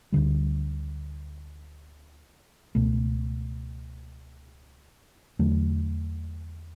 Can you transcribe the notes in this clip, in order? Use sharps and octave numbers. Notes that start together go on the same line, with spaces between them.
D2 D3 G3
C#2 B2 A3
E2 D3 F#3 A3